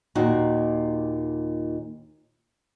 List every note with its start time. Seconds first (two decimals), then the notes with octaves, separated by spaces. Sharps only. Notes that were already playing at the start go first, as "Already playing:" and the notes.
0.15 D#2 A#2 D#4 F#4